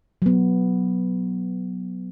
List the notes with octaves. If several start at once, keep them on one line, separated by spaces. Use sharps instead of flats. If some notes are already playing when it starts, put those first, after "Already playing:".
F#3 B3